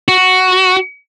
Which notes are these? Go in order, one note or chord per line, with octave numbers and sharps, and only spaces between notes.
F#4